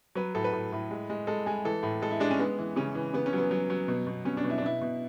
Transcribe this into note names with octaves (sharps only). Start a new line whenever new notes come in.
F#3 B4
A2 A4
B4
A2
A2
G#3
G#3
G#3 A4
G#3 G#4
E3 A4
A2
G#3 A4
E4
G#3 D4
C#4
G#3 B3
E3
C#3 C#4
E3
C#3 B3
C#4
F#3 B3
F#3
F#3
B2
B2
B2 C#4
D4
B2
E4
D4
B2 E4
B2